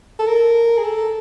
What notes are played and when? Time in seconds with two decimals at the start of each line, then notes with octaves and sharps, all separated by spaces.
0.19 A4
0.27 A#4
0.78 G#4
0.84 A4